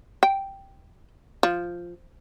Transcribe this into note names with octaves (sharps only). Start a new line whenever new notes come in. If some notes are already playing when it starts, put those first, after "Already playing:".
G5
F3